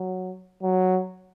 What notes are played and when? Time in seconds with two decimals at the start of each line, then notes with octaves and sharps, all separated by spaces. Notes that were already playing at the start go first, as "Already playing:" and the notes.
Already playing: F#3
0.63 F#3